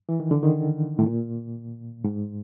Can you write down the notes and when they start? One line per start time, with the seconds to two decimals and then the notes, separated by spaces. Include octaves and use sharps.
0.09 E3
0.20 D#3
0.31 D3
0.43 D#3
0.99 A2
1.06 A#2
2.04 G#2